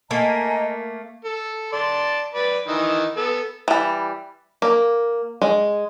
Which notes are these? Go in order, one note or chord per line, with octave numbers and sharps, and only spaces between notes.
A3 A#3 D#5 G#5 A#5
A4
D5 A5 C6
B4 D5
D#3 E3 D#4
B3 A4
E3 G3
A#3
G#3